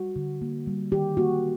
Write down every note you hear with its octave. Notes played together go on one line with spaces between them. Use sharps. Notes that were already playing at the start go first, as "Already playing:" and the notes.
Already playing: G3 F#4
D3
A#3
G3
D#3 G4
A#3 F#4